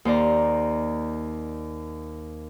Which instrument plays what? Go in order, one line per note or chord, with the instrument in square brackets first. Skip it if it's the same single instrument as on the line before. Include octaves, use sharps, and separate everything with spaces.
[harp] D#2 C5 D5 A#5